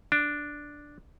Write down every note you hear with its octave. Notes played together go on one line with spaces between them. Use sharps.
D4